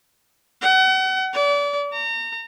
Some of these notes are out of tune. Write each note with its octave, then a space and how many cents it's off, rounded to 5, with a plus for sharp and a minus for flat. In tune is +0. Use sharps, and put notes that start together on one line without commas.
F#5 +35
D5 -35
A#5 -30